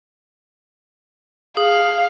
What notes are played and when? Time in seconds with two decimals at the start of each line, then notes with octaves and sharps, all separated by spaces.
1.57 G#4 F5